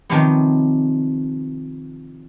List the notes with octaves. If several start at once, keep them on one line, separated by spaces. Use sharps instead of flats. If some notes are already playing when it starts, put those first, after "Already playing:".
C3 D#3 F3 F#3 B3